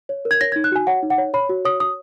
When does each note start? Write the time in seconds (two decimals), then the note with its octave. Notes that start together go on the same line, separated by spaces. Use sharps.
0.09 C#5
0.25 A#4
0.31 G#6
0.41 C#5 A#6
0.52 G#6
0.56 D#4
0.64 F#6
0.72 F#4 G#5
0.87 C#5 F#5
1.03 D#4
1.10 F#5
1.18 C#5
1.34 C#5 B5
1.49 F#4
1.65 C#5 D#6
1.80 C#5 D#6